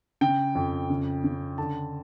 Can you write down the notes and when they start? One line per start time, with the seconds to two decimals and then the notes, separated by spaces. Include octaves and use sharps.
0.21 C#3 G5
0.55 F2
0.90 C#3
1.24 C#3
1.58 D3 A5